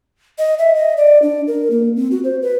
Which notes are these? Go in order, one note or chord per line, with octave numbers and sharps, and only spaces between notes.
D#5
E5
D#5
D5
D4
A#4
A#3
C4
F#4
C5
B4